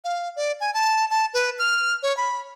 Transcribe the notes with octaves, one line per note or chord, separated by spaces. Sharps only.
F5
D5
G#5
A5
A5
B4
F6
C#5
B5